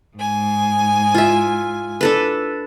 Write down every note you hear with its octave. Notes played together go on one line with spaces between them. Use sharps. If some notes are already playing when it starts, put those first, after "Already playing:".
G#2 G#5
F4 E5
D4 A4 B4